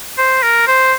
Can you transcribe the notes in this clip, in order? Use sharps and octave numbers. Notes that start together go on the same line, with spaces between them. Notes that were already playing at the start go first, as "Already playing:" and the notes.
C5
A#4
C5